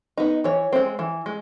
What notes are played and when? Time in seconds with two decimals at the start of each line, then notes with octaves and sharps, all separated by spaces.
0.17 B3 D#4
0.44 E3 C#5
0.73 G#3 C4
0.99 E3
1.26 G#3